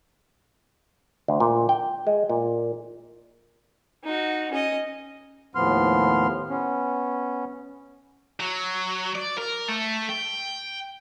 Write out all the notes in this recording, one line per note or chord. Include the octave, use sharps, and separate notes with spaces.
D2
A#2
G5
G#3
A#2
D#4 F#4
C#4 D#5
D#2 A2 F3 B3 C6 F6
B3 C#4
F#3
D5
A#4
A3 A4
G5